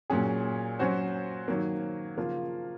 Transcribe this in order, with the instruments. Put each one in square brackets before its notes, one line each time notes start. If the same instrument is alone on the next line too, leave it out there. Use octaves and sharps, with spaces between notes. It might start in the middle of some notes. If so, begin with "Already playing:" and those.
[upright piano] A#2 F#3 C#4 G#4
F#3 C#4 F#4 C5
D#3 F#3 A#3
C#3 F3 A#3 F4